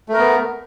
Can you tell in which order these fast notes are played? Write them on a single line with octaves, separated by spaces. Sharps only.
A3 A#4 B3